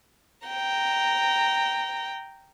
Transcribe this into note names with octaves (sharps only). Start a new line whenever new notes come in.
G5 A#5